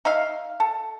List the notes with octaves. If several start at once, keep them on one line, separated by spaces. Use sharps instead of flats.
D#4 E5 F5
A4